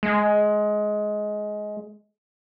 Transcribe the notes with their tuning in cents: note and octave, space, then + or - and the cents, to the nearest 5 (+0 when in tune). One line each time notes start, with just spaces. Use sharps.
G#3 +15